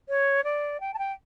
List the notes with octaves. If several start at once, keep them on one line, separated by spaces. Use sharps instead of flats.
C#5
D5
G5
A5
G5